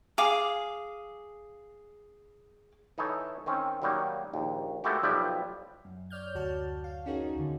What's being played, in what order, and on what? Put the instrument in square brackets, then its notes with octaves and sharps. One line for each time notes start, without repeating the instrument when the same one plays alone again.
[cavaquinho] G#4 F5 D6
[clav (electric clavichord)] E3 D#4 E4 A4 C#5
D#3 C4 C#4
D#3 F#3 G3 A#3 D#4
A#1 D#2
G#3 A3 B3 E4 F#4 G4
B1 F3 G3 E4 G4 B4
[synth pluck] F#2
C#5 D5 F6 G6
D2 F#4 A5
F5
C#4 D#4 F#4 G#4 A#4
D#2 D3